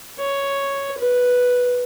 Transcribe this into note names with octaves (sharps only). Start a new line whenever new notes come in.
C#5
B4